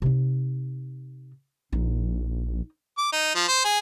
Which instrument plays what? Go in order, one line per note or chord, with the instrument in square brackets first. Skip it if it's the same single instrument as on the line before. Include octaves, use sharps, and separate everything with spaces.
[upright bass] C3 D#4
[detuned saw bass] A#1 [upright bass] D#4
[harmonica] D6
D#4
F3
C5
G#4